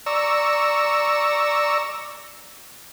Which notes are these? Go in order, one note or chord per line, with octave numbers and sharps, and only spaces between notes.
D5 A#5 C#6 E6